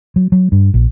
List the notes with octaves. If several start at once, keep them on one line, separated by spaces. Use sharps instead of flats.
F#3
F#3
G2
A#1